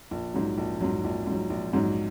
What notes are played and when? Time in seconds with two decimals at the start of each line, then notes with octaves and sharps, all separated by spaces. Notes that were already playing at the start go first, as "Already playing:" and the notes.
0.11 A#1
0.34 G#2 F#3
0.58 A#1
0.80 G#2 F#3
1.04 A#1
1.27 G#2 F#3
1.50 A#1
1.73 G#2 F#3